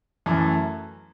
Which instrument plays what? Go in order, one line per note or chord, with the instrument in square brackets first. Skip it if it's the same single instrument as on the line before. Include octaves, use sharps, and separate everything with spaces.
[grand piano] F#2 E3 A3